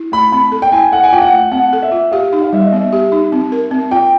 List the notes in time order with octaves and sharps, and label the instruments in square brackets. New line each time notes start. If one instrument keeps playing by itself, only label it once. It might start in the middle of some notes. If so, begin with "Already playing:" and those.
Already playing: [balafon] E4
[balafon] A3 [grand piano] B5
[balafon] C4 [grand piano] B5
[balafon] A4
[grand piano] G5
[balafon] E4 [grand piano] G#5
[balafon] A4 [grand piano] F#5
[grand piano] G#5
[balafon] F4 [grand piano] G5
[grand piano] F#5
[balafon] A3
[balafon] C4 [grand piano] F#5
[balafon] A4
[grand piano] E5
[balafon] F4
[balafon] G4 [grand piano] F5
[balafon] D#4
[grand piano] F5
[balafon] G3 [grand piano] E5
[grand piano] D#5
[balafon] B3 [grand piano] E5
[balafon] G4
D#4
C4
A#4
C4
[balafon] F4 [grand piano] G5